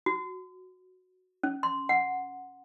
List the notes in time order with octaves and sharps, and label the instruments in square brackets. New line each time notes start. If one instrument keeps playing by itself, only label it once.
[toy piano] F#4
C#4
C6
F#5